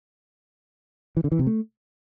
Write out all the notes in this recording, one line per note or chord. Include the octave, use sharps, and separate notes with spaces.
E3
D3
E3
C3
A3